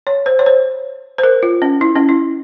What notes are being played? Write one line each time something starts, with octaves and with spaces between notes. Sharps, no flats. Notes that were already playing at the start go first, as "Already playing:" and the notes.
C#5
C5
C#5
C5
C5
A#4
F4
C#4
E4
C#4
E4